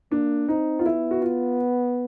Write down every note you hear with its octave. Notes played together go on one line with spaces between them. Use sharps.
A#3 D4
C4 D#4
F4
B3 E4
F#4
F4